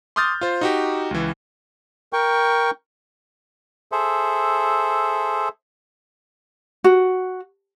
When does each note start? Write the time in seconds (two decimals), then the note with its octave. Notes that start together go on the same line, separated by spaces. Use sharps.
0.16 C6 D6 D#6 F6 G6 A6
0.41 F4 C5
0.61 D#4 F#4 G4
1.11 C#2 E3
2.13 A#4 G5 C#6
3.92 G#4 A4 C5 E5
6.84 F#4